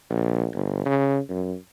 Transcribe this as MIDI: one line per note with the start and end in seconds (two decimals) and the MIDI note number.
0.10 0.46 34
0.54 0.81 31
0.86 1.19 49
1.29 1.55 42